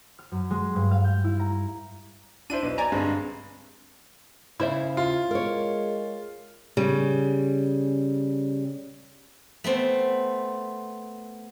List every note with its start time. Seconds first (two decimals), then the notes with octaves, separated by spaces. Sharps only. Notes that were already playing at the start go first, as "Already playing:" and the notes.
0.19 F6
0.31 F#2
0.51 G#3
0.76 G2
0.91 F5
1.04 G6
1.24 E4
1.39 A#5
2.50 D4 E4 C5 D#7
2.62 B1 B4
2.78 D5 G#5 A#5
2.92 G2 D3 G#3 C4
4.60 C#3 E4 C5 E5
4.97 F4
5.31 G#3 A#4 C#5
6.77 C#3 G3
9.64 A3 B3 C4